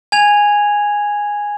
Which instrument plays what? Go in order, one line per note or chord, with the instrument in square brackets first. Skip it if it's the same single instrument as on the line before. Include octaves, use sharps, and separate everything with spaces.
[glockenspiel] G#5 G#6 F7